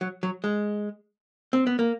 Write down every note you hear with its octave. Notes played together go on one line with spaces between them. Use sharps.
F#3
F#3
G#3
C4
B3
A#3